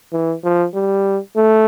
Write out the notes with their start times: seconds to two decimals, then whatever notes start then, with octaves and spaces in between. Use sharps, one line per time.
0.13 E3
0.44 F3
0.75 G3
1.37 A3